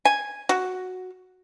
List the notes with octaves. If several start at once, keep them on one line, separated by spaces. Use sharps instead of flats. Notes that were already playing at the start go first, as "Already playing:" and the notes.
G#5
F#4